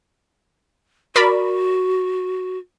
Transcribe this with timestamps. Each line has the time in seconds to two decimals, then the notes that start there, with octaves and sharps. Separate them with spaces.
1.16 F#4 A#4 D5 B5